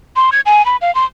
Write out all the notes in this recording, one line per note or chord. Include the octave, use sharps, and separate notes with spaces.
C6
G#6
G#5
B5
F5
C6